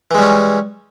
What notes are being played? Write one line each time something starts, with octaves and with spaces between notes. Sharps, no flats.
E3 G3 G#3 C#4